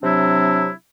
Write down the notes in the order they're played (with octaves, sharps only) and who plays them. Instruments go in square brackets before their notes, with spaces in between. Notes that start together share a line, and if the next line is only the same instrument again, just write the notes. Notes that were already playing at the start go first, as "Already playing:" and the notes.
[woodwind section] C3 F#3 C4 D4 E4